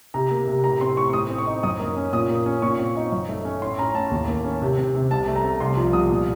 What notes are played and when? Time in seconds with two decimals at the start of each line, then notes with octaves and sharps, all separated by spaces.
0.14 C3 A#5
0.31 A#3
0.48 C3
0.64 A2 A#5
0.81 C4 C6
0.97 A2 C#6
1.13 A2 D#6
1.30 C4
1.38 C#6
1.47 D#4
1.63 F#2 D#6
1.79 A#3
1.96 C#4
2.13 A#2 D#6
2.29 A#3
2.46 C#4
2.62 A#2 C#6
2.80 C4
2.96 D#4
3.12 F#2
3.29 A3
3.45 C#4
3.62 A2 C6
3.79 C#4 A#5
3.95 A2 A5
4.11 D#2
4.28 A#3
4.44 C#4
4.62 C3
4.78 C4
4.95 C3
5.11 C2 A5
5.28 A3
5.36 A#5
5.44 C4
5.60 C2 C6
5.77 F3
5.93 C2 D#6
6.10 A#2